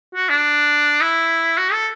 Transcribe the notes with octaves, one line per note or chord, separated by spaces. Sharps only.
F#4
D4
E4
F#4
A4